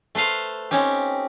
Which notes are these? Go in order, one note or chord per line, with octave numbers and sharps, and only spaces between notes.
A3 B4 C5 F5
C4 C#4 D#4 G4